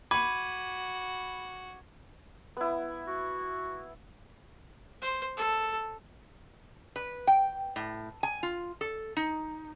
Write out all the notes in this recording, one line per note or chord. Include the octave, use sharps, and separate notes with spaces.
F#4 B5 D6 G#6 D#7
B3 E4
F#4
C5
A4
B4
G5
A2
G#5
F4
A4
D#4